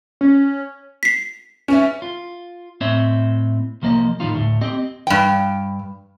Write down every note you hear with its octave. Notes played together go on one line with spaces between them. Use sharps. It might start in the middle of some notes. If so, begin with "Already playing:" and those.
C#4
B6 C7
C#4 B4 D5 E5
F4
A2 C4 C5 C#5 D#5 E5
C2 F3 A#3 D5 D#5
A2 D#3 G3 D#4 F4
D2 A2
C4 G4 D#5
G2 G5